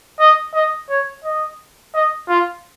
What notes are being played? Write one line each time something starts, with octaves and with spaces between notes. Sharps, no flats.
D#5
D#5
C#5
D#5
D#5
F4